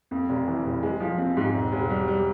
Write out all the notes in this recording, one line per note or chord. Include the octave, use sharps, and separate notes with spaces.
F2
F1
E3
F1
G#3
F3
C4
G#2
E1
E1
G3
G3